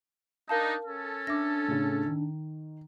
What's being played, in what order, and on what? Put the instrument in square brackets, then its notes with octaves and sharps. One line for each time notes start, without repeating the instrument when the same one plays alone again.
[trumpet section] D4 D#4 [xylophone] A#4 F5 A5
[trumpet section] C#4 A4
[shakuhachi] D4 [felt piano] E5 [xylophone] D6 A#6
[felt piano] A2 C#3
D#3